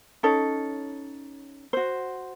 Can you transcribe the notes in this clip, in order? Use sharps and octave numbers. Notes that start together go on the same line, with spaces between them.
C#4 D#4 A4 C#5
F#4 C5